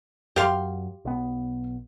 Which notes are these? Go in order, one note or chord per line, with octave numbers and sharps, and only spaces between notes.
F#2 F#3 G4 F5 C6
B1 B3